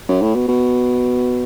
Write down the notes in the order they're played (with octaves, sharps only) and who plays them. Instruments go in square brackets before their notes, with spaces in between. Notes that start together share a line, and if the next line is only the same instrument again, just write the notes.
[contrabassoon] F#2
A2
B2
B2